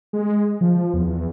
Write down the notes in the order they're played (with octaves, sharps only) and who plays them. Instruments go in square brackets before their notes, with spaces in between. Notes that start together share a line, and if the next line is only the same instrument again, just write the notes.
[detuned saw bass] G#3
F3
E2